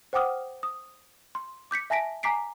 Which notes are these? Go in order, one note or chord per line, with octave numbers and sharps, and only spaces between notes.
C5 F#5 G5 D6 D#6 F6
D#6
C6
D6 G6 B6 C#7
E5 G#5 A5 A#6 B6 D7
G#5 A#5 D6 B6 C7 D7